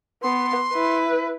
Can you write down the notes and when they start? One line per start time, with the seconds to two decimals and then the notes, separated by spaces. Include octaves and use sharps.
0.23 B3 C6
0.73 E4 B4